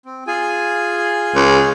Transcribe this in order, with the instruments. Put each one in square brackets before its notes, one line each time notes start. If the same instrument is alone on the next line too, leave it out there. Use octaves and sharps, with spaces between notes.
[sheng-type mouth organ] C4
F4 G#4 G#5
[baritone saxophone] C#2